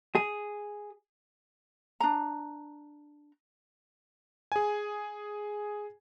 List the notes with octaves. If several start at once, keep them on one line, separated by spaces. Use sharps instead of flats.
G#4
D4 A#5
G#4 G#5